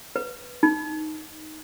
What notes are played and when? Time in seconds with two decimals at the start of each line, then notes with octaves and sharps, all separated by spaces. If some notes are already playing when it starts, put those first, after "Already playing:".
0.16 B4
0.63 D#4